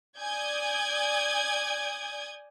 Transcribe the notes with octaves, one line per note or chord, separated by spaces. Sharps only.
D5 G#5 D#6 G6 G#6